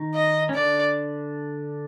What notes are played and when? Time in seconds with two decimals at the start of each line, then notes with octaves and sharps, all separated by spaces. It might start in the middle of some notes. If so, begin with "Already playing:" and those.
Already playing: D#3 D#4
0.15 D#5
0.49 C#4
0.54 D3 D4 D5